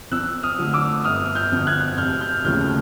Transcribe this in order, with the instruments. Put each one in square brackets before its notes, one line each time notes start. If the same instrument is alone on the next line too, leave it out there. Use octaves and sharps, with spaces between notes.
[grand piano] F2 E6 F#6
D#6 F6
D3 F3 A3
D6 E6
G1 D#6 F6
F6 G6
F2 D3
F#6 G#6
F1 F6 G6
F6 G6
D#2 C#3 F3 A3 F6 G6